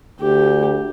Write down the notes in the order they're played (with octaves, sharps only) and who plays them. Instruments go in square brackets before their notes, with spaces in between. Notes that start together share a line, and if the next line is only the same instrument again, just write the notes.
[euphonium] D2 [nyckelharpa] G4